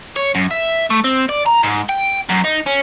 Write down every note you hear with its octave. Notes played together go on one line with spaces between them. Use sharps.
C#5
F#2
E5
A3
C4
D5
A#5
G#2
G5
F#2
D#4
C#4